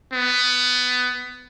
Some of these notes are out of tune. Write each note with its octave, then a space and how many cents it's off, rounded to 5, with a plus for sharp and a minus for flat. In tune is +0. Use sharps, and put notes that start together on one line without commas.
B3 +15